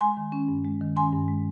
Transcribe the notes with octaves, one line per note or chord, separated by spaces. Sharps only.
G#3 G#5 C6
D#3
C#4
G2
G#3
D#3
C#4 G#5 C6
G2
G#3